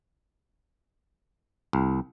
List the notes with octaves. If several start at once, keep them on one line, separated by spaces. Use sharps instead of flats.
C2